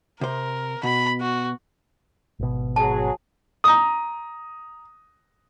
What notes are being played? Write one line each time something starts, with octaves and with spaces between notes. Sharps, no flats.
C3 A#4 C5
B2 B5
F#4
G#1 B2
F#3 G#4 A5
A#5 D#6